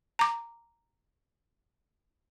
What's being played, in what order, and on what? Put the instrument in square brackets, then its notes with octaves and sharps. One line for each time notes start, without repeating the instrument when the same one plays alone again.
[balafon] A#5 D6